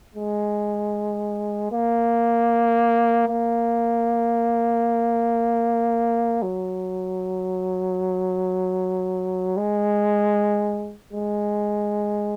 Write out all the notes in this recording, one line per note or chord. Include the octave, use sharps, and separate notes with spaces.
G#3
A#3
A#3
F#3
G#3
G#3